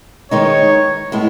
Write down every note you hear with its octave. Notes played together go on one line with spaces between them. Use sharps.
D#3 G#3 B3 D#4 C#5
A2 G#3 B3 E4